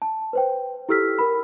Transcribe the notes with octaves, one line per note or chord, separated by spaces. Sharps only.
A5
B4 C5 G5
E4 G4 A4 E6 F6 B6
A#4 B5